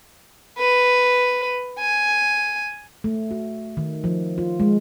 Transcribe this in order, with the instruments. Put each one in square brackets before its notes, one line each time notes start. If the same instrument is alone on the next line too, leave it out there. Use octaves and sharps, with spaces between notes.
[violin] B4
G#5
[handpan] A3
F#4
D#3
F3
F4
G#3